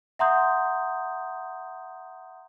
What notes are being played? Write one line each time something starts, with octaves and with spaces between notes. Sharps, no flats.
E5 F#5 A#5 C6 D#6 G6